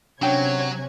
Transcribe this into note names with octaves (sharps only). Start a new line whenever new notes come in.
C3 F#3 C#4 D4 C#5 G5 G#6